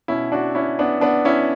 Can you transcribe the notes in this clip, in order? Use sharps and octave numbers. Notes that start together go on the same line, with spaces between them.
B2 C#4 E4
D4 F#4
C#4 E4
B3 D4
B3 D4
C#4 E4